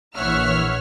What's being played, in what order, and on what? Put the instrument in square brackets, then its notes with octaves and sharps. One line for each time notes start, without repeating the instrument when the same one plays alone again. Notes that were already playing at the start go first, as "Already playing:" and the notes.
[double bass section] A#1 A#2 E3 [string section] C#5 F6 [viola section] E5 F#5